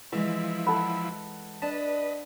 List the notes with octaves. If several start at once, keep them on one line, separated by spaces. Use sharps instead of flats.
E3 F3 G#3 E4 E6
A4 F#5 B5
D4 B4 D#5 A5